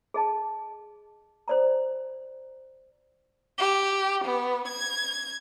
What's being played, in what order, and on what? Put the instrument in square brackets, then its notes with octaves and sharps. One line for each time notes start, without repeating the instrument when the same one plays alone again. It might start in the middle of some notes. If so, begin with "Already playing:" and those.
[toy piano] G#4 D#5 A5
C5 D5 A#5
[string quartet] G4
B3
G#6